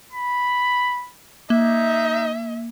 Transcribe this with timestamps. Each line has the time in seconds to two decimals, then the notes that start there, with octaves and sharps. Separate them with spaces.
0.12 B5
1.50 A#3 D#4 E5